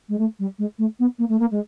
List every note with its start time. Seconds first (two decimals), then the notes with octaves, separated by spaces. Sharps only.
0.09 G#3
0.18 A3
0.39 G3
0.58 G#3
0.78 A3
0.99 B3
1.18 A#3
1.29 A3
1.39 A#3
1.51 G#3